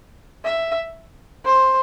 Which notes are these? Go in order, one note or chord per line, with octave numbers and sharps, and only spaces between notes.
E5
C5